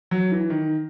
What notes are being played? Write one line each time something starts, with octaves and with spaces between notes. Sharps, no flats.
F#3
E3
D#3